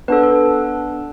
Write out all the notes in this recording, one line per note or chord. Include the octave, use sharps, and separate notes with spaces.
B3 D4 A4 B4
A4